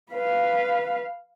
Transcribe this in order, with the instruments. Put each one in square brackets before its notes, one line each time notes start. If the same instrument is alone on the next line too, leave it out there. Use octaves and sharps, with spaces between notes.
[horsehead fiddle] B4 F5